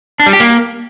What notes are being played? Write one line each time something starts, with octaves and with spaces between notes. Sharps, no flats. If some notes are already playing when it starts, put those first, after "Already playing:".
D4
G3
G4
A#3